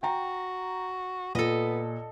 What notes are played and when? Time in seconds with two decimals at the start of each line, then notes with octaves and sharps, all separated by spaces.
0.03 F#4 G5 A#5
1.35 A#2 B3 A4 D#5